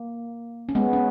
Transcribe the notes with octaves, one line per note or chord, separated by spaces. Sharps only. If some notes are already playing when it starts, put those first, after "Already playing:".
Already playing: A#3
C#4
G#3 B3
C#4